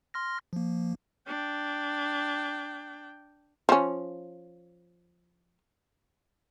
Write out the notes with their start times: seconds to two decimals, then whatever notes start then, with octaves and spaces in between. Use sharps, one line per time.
0.14 C6 F6 A#6
0.53 F3 A#3
1.28 D4 G5
3.69 F3 C#4